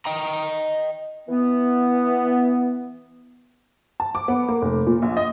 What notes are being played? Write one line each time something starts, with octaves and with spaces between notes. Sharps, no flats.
D#5 G5 A#5
E3 B3
A5
D6
B3
A#3
F1
A#2
A#1
D#5